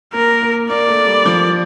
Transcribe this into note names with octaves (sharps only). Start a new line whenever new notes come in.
A#3 A#4
A#3
A#3 D5
A3
G3
F3